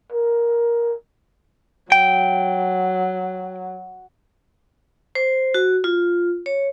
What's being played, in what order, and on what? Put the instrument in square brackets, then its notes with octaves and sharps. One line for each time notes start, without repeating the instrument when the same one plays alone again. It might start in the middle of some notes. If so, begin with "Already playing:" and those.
[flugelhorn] A#4
[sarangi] F#3 [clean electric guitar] G5
[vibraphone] C5
F#4
F4
C#5